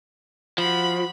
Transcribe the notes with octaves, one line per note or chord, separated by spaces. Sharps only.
F3 F#4 B5